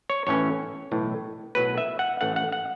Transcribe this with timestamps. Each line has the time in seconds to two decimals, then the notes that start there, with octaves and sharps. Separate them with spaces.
0.09 C#5
0.27 A1 A2 E3 C#4 C#5
0.92 B1 A2 E3
1.55 B1 A2 F#3 B3 B4
1.78 E5
1.99 F#5
2.21 A1 A2 E3 A3 C#4 F#5
2.36 F#5
2.52 F#5